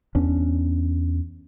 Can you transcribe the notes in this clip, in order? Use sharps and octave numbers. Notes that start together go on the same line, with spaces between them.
E2 B3 C#4 D4